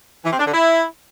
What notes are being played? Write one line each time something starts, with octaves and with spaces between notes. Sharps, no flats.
E3
C4
D4
D3
E4